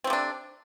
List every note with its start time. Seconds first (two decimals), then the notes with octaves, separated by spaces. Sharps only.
0.04 C4
0.07 A3
0.10 C3
0.13 D4